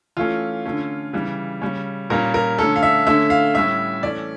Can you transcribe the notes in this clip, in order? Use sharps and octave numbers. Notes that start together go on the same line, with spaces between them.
E3 A3 C#4 F4
D3 A3 C#4
C#3 E3 G3
C#3 G3 C#4
A#2 G3 A#3 C#4 A#4
A#4
D3 A3 C#4 A4
F5
E5
D3 A3 C#4 E5
F5
A2 G3 C#4 E5
E3 A3 C#4 D5